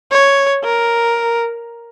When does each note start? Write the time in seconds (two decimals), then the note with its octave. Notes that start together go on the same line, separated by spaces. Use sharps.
0.12 C#5
0.64 A#4